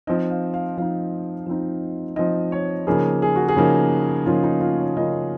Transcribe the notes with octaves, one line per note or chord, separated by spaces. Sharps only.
F3 C4 D#4 D#5
F5
F5
F3 C4 D#4 F5
F3 C4 D#4
F3 C4 D#4 D#5
C#5
C#3 F3 A#3 D#4 G#4
G#4
F#4
G#4
C#3 F3 A#3 D#4
C#3 F3 A#3 D#4 F4
D#4
F4
C#5
C#3 F3 A#3 D#4 D#5